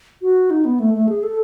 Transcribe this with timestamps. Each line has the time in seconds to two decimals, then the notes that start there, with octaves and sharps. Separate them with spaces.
0.22 F#4
0.51 D#4
0.65 B3
0.80 A3
0.94 A3
1.09 G#4
1.23 A4